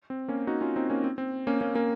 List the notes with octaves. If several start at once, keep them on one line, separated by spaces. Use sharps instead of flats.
C4
A#3 C#4
D#4 F#4
C#4 F4
C4 D#4
A#3 C#4
C4
C4
A#3 C#4
A#3 C#4
A#3 C#4